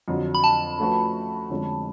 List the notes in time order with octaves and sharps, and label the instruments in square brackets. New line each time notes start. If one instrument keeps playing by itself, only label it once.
[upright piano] F2 D3 F#3
[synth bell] B5
A5
[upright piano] F3 A3 C#4 F#4 B4
F2 D3 G#3 C#4